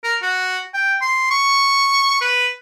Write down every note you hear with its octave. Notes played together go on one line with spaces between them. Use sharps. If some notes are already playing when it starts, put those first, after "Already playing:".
A#4
F#4
G5
C6
C#6
B4